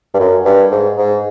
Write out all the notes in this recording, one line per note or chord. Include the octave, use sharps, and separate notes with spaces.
G2
F#2
G2
G#2
G#2